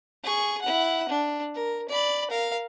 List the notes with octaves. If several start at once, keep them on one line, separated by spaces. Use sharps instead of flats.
G#4 C#6
E4 F#5
D4
A#4
D5 B5
A#4 F5